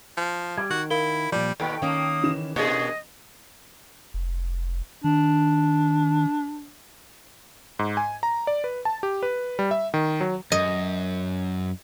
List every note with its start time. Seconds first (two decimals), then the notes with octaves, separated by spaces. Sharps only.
0.17 F3
0.58 G3 G#6
0.70 D#3 F#4
0.90 E4 A#4 F5 G7
1.32 A#2 F3 G3 D5
1.60 D#2 B2 A4 B4 G5 C#6
1.82 D#3 A#3 C#4 D#6
2.23 C#3 E3 E7
2.56 B2 A#3 B3 D4 G#4 D#5
4.14 F1
5.04 D#3 D4
7.79 G#2
7.97 G#5
8.23 A#5
8.47 D5
8.64 B4
8.85 A5
9.03 G4
9.23 B4
9.59 G3
9.71 E5
9.94 D#3
10.21 F#3
10.52 F#2 D#5